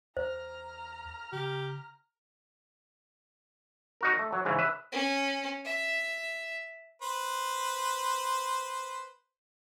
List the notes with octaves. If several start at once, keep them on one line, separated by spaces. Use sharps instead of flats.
E2 C5 A#5 F6
C#3 G4
D#4 F#4 A#4
A3
F#3
G#2 C#3 E3
B4 E5
C#4
E5
B4 C5